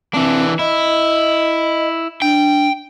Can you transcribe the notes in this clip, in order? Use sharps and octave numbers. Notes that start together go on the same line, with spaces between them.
E3 C4 D4
E4 D#5
D4 G5